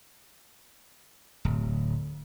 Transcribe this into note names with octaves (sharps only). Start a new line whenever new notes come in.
D1